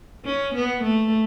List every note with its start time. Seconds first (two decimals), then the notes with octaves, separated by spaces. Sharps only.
0.25 C#4
0.55 B3
0.84 A3